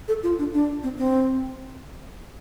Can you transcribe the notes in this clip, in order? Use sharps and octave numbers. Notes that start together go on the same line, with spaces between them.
A4
F4
D4
D4
C4
C4